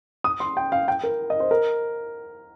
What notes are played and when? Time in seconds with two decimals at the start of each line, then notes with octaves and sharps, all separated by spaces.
0.24 D#6
0.40 C6
0.57 G5
0.72 F5
0.88 G5
1.03 A#4
1.30 D#5
1.40 C5
1.51 A#4